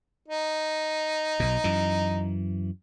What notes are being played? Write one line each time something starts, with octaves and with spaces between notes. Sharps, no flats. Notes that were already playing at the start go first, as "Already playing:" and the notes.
D#4
B1 B2
F#2 E3